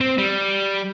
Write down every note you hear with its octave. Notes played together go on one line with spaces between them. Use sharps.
C4
G3